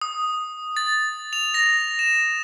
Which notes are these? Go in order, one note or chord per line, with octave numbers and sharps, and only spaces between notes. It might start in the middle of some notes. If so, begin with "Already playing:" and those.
D#6
A6
F7
A#6
E7